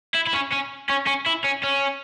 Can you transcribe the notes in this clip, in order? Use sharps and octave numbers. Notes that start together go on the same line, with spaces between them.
E4
E4
C#4
C#4
C#4
C#4
E4
C#4
C#4